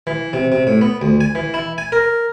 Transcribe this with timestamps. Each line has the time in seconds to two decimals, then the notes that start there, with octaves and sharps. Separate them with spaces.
0.07 E3
0.33 C3
0.52 C3
0.67 A2
0.81 B3
1.02 D2
1.20 G#5
1.35 E3
1.54 E4
1.78 G#5
1.92 A#4